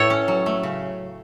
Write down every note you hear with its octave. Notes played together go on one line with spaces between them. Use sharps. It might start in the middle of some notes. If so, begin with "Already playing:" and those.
Already playing: A2 A4 C#5
C#4
F#3
A3
C#3